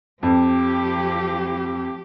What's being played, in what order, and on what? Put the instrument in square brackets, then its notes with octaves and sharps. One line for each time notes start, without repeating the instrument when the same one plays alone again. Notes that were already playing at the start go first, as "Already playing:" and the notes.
[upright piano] F2 [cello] F3 G4